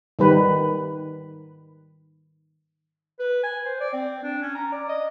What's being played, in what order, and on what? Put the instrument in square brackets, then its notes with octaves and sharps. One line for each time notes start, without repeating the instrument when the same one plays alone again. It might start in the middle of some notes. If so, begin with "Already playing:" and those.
[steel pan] D#3 G3 B4
[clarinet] B4
G#5
C5
D5
C4
D4
C#4
A#5
D5
D#5